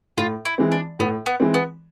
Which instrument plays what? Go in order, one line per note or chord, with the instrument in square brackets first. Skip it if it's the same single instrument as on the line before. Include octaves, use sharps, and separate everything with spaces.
[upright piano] A2 [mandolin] F4
[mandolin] E4
[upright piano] E3 G#3 C4
[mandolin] D4
[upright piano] A2 [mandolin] B3
[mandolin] B3
[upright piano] E3 G#3 C4
[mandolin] B3